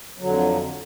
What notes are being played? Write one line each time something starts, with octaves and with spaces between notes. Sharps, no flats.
F2 D3 F#3